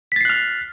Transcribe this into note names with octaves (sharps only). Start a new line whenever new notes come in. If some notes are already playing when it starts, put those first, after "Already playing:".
F6 F#6 A6 B6 C7